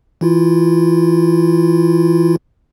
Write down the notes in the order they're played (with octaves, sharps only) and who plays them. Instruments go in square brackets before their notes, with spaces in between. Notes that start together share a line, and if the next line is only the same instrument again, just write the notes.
[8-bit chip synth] E3 E4 F4